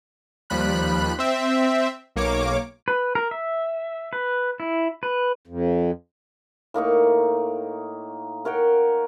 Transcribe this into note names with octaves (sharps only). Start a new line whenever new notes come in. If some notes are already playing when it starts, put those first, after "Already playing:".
D#2 F3 G3 B5 F#6
C4 E5
B1 A#3 C#5 D6
B4
A#4
E5
B4
E4
B4
F2
A2 A#3 D#4 C#6
A#4 C#5 F#5 G5